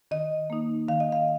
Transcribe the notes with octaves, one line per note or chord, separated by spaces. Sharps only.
D#3 D#5
A#3 D#4
D#3 F5
D#5
F5